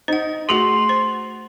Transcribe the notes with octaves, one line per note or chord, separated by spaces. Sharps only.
D#4 C5 F#5
A3 F#4 G#4 C6 F7 F#7
C5